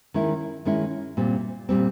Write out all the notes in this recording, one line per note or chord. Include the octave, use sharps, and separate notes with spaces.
D#3 G#3 C#4 E4
D#3 G#3 C#4 E4
A#2 G3 C4
A#2 G3 C4